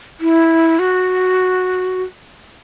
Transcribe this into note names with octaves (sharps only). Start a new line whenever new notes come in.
E4
F#4